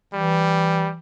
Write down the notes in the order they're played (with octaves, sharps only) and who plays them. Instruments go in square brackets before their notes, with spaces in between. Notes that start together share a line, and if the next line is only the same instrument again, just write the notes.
[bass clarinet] E3 [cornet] G3